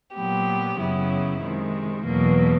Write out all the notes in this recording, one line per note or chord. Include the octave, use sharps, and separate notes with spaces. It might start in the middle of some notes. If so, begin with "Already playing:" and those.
A#2 F#3 B3 G4
F#2 C#3 F#3 B3 E4
C3 D#3 G#3
E2 B2 F#3 A#3